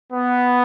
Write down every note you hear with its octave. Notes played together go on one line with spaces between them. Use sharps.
B3